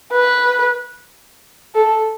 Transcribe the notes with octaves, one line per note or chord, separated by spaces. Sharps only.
B4
A4